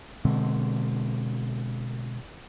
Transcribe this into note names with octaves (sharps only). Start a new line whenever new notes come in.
B2 D3 G#3 C4